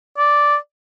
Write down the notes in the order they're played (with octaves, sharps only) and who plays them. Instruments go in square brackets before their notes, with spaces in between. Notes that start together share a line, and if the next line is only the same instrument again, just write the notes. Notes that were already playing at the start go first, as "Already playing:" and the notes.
[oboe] D5